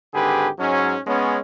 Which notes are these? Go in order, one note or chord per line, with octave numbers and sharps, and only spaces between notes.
G#1 D3 G4 G#4 B4
G#2 F#3 G#3 C#4
G#3 B3 C#4